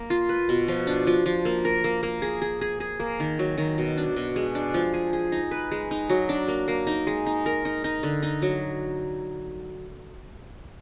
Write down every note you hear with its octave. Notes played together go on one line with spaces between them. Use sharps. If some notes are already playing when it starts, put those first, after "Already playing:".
Already playing: A#3
F4
B4
B2
F3
D4
F3
F3
A#3
A#4
A#3
A#3
G#4
G#4
G#4
G#4
A#3
D#3
F#3
D#3
B2
D4
B2
G#3
D4
F3
G#4
G#4
D#4
B4
G#3
D#4
F#3
D4
A#3
A#3
D#4
G#3
D#4
A#4
D#4
D#4
D3
D#4
F#3